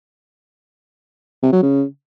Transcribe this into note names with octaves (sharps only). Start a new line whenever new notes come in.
C3
F#3
C#3